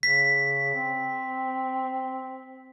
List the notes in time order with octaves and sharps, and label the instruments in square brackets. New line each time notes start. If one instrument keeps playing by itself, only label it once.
[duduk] C#3 [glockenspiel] B6
[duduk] C4